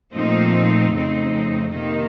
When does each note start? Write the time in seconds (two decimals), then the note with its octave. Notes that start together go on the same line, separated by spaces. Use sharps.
0.14 A#2 F3 A3 C4 D#4
0.92 F2 C#3 A3 C4 D#4
1.70 C3 D#3 A#3 D#4